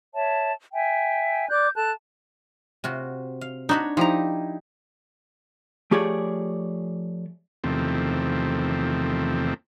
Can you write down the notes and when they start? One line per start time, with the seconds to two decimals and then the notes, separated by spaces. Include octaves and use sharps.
0.14 C#5 E5 A5
0.72 E5 G5 G#5
1.50 D5 D6 F#6 G6
1.75 A4 A5 F#6
2.84 C3 F4 F#4
3.41 F5
3.69 D4 D#4 F#4 C#5 A5 B5
3.97 F3 D#4 E4 G4 A#5
5.91 F3 A3 G4 G#4 C#5 D5
7.64 E2 C3 D#3 F3 A3 C4